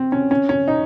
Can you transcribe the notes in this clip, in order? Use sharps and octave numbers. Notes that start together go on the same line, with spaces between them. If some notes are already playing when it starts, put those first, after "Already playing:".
Already playing: C4
C#4
C#4
C#4
D#4